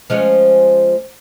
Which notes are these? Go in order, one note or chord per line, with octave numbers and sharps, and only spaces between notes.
F3 G#3 C#4